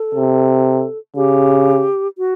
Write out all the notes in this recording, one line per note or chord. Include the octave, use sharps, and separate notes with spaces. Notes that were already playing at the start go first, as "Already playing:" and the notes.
Already playing: A4
C3
C#3 G4
F#4